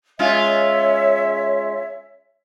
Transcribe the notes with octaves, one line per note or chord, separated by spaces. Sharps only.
G#3 C#4 F4 C#5 E5